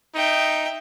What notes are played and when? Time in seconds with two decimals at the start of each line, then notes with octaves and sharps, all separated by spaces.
0.15 D#4 E5 G5